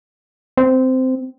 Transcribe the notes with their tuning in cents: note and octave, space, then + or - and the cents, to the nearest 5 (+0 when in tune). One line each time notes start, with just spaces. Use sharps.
C4 -15